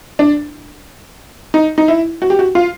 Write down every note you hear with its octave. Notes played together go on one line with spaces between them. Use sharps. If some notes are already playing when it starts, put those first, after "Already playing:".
D4
D#4
D#4
E4
F#4
G4
F#4
F4